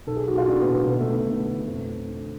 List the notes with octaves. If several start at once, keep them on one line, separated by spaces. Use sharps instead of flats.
B1 A4
G#4
B1 F#4
F4
A2 D4
B3
B1
B3
B2 B3
A3
B1
B1 A3
B2
F2 A3
F2
D3